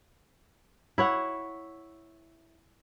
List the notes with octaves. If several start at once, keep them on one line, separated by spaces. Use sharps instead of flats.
E4 C#5 F#5